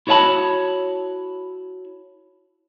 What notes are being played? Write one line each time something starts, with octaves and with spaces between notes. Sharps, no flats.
E4 F#4 C#5 D#5 A5 B5